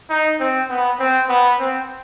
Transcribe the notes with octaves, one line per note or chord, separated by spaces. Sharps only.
D#4
C4
B3
C4
B3
C4